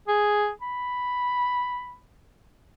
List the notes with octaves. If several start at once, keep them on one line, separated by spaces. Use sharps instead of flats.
G#4
B5